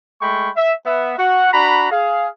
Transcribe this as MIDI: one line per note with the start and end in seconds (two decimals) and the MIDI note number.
0.22 0.50 56
0.22 0.50 57
0.22 0.50 79
0.22 0.50 83
0.22 0.50 85
0.56 0.74 76
0.86 1.15 59
0.86 1.15 76
1.19 1.53 66
1.19 1.53 78
1.53 1.90 62
1.53 1.90 66
1.53 1.90 82
1.53 1.90 83
1.91 2.28 68
1.91 2.28 77